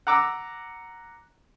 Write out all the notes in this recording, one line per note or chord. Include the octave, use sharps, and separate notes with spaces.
F#5 A#5 D6 E6